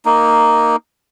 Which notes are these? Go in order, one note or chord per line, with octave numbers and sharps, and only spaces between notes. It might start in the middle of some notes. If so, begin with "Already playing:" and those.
A#3 D#4